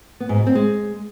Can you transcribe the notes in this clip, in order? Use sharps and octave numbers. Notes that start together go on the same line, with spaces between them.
B3
G#2
B2
C4
G#3